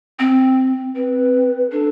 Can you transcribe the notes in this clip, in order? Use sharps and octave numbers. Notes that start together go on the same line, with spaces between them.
C4
C4 B4
D4 A4